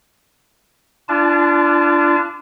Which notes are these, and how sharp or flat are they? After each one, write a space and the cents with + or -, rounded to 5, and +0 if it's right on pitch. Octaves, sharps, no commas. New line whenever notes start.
D4 +0 F4 -35 A5 -35